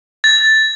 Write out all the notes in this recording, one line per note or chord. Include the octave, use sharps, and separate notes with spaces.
A6